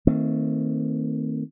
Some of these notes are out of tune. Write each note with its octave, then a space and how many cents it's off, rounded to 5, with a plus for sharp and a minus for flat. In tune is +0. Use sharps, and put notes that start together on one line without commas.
D#3 +20 A3 +40 C4 +5